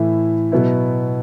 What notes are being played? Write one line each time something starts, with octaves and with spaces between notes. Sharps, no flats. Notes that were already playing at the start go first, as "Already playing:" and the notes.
Already playing: A2 E3 A3 E4 E5
B2 F#3 B3 E4